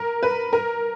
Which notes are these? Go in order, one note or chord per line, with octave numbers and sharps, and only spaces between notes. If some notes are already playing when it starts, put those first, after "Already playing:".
Already playing: A#4
B4
A#4